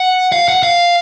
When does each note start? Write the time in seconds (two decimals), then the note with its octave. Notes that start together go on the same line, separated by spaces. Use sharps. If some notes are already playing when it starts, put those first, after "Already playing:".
Already playing: F#5
0.32 F5
0.48 F#5
0.63 F5